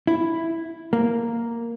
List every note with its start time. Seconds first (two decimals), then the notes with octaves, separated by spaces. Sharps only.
0.07 E4
0.93 A#3